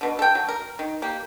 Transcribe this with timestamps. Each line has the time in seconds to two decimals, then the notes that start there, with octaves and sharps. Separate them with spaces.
0.01 B2 D3
0.19 A4 G5
0.35 F#3
0.48 A#4
0.79 D#3
1.02 A#3 G4